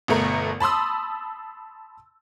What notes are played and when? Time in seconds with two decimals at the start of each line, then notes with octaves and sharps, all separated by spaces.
0.08 G1 B2 A3 A#4
0.60 A5 B5 C6 D#6 E6